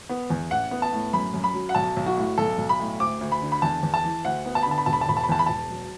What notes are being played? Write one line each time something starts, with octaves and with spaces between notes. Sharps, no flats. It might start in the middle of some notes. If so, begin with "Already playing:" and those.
B3
E2
A1 F#5
B3
A5
A2
F#2 B5
F#2
B5
F#3
F#5
B1 A5
B1
F#4
A2
B1 A4
B1
B5
A2
D2 D6
D2
B5
D3
B5
E2 A5
E2
A5
E3
D2 F#5
B3
A5
B5
D3
A5
B5
E1 A5
B5
A5
E1 B5
A5
B5
E2 A5
B5
E1 A5
F#3